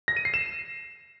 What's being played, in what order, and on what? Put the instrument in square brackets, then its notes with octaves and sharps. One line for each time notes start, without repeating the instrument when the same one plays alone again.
[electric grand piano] A#6
D#7
C7
E7